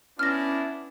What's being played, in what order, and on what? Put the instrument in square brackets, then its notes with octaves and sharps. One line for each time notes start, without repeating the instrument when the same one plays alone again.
[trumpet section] B3 D4 E4 [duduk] C#4 [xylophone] F6 A#6